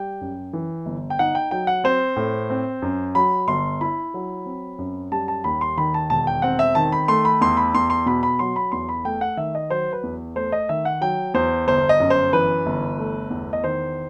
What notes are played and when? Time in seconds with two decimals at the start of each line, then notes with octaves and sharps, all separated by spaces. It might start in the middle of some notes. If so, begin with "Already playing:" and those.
Already playing: G3 G5
0.21 F#2
0.53 E3
0.86 G1
1.10 G5
1.19 D#4 F#5
1.35 G5
1.51 F#3 G5
1.67 F#5
1.84 C4 C5
2.16 A2
2.50 C4
2.82 F#2
3.15 F#3 B5
3.48 G1 C6
3.81 E4 B5
4.14 F#3
4.46 C4
4.78 F#2
5.12 G3 A5
5.28 A5
5.44 D#2 B5
5.61 C6
5.77 D#3 B5
5.94 A5
6.10 E1 A5
6.27 G5
6.42 C4 F#5
6.59 E5
6.75 D#3 A5
6.92 B5
7.08 A3 C6
7.25 B5
7.41 E2 C6
7.57 B5
7.74 E2 C6
7.90 C6
8.06 B2 B5
8.23 B5
8.39 F#3 C6
8.56 B5
8.72 E2 C6
8.89 B5
9.05 A3 G5
9.21 F#5
9.37 D#3 E5
9.55 D#5
9.70 F#3 C5
9.93 B4
10.03 E2
10.36 A3 C5
10.52 D#5
10.69 D#3 E5
10.85 F#5
11.01 F#3 G5
11.34 E2 C5
11.67 G1 C5
11.89 D#5
12.00 F#2
12.10 C5
12.33 E3 B4
12.66 G1
12.98 A3
13.30 E2
13.53 D#5
13.64 D#3 C5